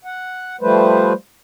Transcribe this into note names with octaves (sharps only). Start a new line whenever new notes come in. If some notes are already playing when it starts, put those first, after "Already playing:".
F#5
F3 G3 A3 B4 C5